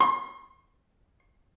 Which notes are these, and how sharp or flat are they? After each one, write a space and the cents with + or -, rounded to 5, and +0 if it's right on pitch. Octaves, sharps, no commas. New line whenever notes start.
C6 +40